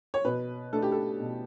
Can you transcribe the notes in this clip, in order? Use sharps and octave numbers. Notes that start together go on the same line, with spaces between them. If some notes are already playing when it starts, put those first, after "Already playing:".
C#5
B2 B4
A3 D4 A4
G4
A4
B2